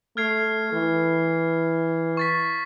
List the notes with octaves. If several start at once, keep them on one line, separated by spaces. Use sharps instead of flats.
A3 F6 G#6 C7
E3
C#6 A6 B6